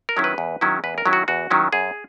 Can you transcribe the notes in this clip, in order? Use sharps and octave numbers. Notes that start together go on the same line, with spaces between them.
A#4
D#3 F#3 C#4 E4
B4
E2
D#3 F#3 C#4 E4
E2 B4
A#4
D#3 F#3 C#4 E4
F#4
E2 F#4
D#3 F#3 C#4 E4
F#2 G#4